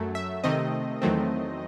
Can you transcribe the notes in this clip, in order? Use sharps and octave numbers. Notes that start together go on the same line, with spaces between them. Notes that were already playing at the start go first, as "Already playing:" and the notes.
Already playing: F#2 F#3 A3
E5
C3 D#3 A3 C4 D#5
E2 D#3 F#3 A3 C4